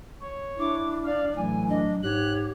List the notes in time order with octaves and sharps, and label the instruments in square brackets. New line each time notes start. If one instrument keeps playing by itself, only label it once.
[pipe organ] C#5
[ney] D4 [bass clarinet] E4 [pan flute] D6
[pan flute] D5 [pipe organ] F5
[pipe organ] A2 E3 [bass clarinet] F#3 [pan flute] G#5
[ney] D4 [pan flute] D#5
[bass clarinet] G#2 [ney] G4 [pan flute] C#5 [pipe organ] F#6